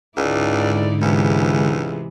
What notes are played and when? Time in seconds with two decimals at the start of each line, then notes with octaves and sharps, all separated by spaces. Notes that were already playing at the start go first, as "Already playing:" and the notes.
0.17 C#2 G#2 D3 D#4 E4 D5
1.02 C#2 C3 E3 G#3